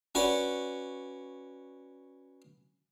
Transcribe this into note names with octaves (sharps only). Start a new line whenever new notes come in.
C#4 F#4 B4 D5